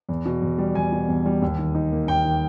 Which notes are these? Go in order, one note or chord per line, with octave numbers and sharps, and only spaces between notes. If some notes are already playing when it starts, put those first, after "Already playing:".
E2
B2
E2
G3
E2 G#5
B2
E2
G3
D#2
D#3
D#4
A#3
D#2 G5
D#3